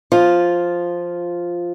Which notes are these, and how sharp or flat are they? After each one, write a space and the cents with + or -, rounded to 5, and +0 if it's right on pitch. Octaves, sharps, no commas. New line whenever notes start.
F3 +0 F4 +0